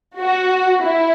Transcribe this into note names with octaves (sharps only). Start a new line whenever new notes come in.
F#4
E4